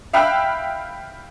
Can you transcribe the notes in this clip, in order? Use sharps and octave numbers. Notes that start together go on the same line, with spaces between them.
E5 F5 G5 B5 E6 F#6